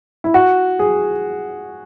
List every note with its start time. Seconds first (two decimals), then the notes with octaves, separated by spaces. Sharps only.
0.24 E4
0.34 F#4
0.79 G#4